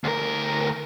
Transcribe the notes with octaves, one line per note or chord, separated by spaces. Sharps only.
D2 A#4